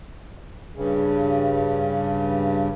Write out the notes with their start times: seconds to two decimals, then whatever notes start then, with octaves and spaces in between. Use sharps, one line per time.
0.76 G2 C#3